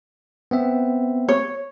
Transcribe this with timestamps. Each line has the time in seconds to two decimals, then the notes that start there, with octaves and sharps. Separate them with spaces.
0.51 B3 C4 E5
1.29 C#5